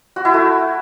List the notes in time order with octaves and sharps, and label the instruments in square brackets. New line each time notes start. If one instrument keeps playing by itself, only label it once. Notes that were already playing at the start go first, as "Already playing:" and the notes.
[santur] F#4
E4
A3